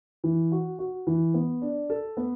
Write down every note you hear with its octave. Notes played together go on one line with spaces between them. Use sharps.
E3
F#4
F#4
E3
B3
D4
A4
B3